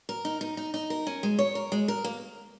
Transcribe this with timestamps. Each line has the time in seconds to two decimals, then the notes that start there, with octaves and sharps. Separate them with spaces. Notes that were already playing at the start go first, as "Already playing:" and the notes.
0.09 A#4
0.25 D#4
0.41 D#4
0.57 D#4
0.74 D#4
0.90 A#4
1.07 C#4
1.23 G#3
1.39 C#5
1.55 A#4
1.72 G#3
1.88 A#4
2.04 A#3